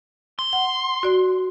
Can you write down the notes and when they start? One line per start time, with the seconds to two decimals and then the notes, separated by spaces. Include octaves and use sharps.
0.39 C6
0.53 F#5
1.03 F#4 D5